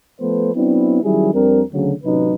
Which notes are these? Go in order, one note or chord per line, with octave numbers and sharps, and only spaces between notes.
F3 A3 B3 A4 B4 C5
F#3 B3 C4 D4 E4
D#3 F#3 G3 C#4 E4 G#4
F2 G3 C4 D4 A#4
D2 C#3 F#3
A1 C3 F#3 C#4 D#4 B4